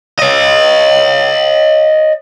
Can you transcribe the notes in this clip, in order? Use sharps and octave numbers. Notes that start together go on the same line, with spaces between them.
C#5 D#5